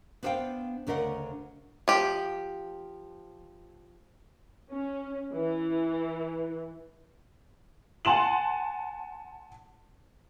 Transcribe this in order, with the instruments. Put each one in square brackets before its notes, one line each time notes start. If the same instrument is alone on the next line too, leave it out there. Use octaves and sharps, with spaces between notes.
[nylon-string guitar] B3 D4 B4 C5 F5 G5
D2 C#3 D4 A#4 D#5 F#5
[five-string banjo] F3 G4
[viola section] C#4
E3
[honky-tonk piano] F#5 G#5 A5 C6 E7 F#7